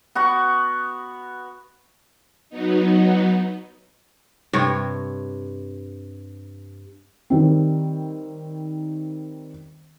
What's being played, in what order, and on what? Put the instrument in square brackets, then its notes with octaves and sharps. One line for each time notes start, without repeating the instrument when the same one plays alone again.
[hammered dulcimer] B3 F#4 C#6
[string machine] F#3 B3 D#4
[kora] G2 C3 C#5
[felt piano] D#3 G3 C4